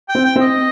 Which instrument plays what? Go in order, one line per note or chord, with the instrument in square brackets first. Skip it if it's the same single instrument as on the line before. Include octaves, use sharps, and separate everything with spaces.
[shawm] G5
[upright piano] C4
[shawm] G5
[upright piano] C4
[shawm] D#5